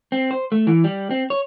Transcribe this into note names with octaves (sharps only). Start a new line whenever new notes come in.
C4
C5
A3
E3
G3
C4
C#5